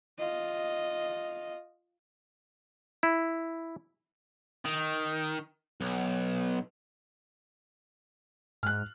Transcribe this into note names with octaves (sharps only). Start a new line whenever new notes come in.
F4 D#5
E4
D#3
B1
G#2 F6 F#6